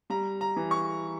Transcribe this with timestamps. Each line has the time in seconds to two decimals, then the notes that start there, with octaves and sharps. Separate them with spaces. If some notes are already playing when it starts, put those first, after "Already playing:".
0.10 G3 A#5
0.41 A#5
0.56 E3
0.71 C#6